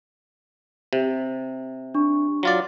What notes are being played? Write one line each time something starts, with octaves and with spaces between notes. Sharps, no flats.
C3
D4 C#6
F#3 F4 D5